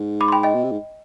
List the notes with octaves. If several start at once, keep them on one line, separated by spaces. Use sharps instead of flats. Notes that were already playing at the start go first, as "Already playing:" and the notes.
Already playing: G#2
B5 D6
C6
G5 B5
D#5 G5
B2
C3
G#2